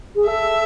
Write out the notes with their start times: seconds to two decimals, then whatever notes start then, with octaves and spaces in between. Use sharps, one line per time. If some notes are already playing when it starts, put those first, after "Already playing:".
0.15 G#4
0.27 A4 E5